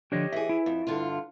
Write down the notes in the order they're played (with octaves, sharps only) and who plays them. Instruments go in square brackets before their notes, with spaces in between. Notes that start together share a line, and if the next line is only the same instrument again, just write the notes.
[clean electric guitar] D3 F3 D4 [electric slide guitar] G4 C#5 D#5
[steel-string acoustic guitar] E3 G#4 [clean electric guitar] E5
[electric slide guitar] E4
[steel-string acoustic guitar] F2
G2 D3 F4